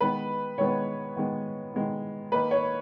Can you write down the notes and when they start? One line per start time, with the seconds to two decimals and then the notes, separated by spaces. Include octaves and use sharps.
0.01 D#3 G#3 B3 B4
0.58 D#3 G#3 B3 C#5
1.16 D#3 G#3 B3
1.74 D#3 G#3 B3
2.32 D#3 A#3 D#4 B4
2.51 C#5